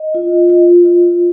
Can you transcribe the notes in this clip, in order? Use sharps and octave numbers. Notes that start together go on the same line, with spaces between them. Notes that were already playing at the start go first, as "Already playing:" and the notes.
Already playing: D#5
F4
F4
F4